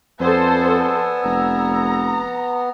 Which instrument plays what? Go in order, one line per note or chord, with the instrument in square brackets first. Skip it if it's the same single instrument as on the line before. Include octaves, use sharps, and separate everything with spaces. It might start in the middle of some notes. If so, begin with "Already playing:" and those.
[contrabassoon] F2 [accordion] B3 [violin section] A4 C5 [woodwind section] D5 G#5 E6
[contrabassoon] F1 [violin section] A#5